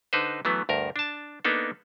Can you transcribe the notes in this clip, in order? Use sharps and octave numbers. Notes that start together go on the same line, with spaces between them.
D3 D#4 B4 C5
E3 F#3 A3 B3
D2 G2 A#4
D4 A5
A#3 B3 D4 D#4 A4